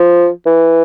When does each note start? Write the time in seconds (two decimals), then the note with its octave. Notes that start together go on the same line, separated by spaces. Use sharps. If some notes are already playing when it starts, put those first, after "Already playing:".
Already playing: F3
0.46 E3